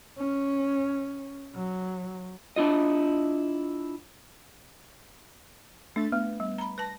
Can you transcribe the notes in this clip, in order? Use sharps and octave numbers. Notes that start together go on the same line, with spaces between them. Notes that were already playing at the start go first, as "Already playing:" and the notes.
C#4
F#3
D4 E4 F4 D#5
A3 D4 E5 A6
A3 B3
G3
A#5 B5
B4 A5 A#6